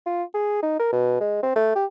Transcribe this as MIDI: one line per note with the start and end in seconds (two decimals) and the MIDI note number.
0.06 0.23 65
0.34 0.60 68
0.62 0.77 63
0.79 0.88 70
0.92 1.19 47
1.20 1.40 56
1.43 1.53 60
1.56 1.71 57
1.75 1.85 67